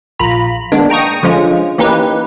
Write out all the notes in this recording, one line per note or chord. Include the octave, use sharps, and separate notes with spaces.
A#1 F4 A#5 B5
D#3 G#3 A#3 B3 D4
G5 A#5 C#6 D#6
D3 F3 G#3 C#4 F4
E3 A#3 C#4 D#4 G4 B4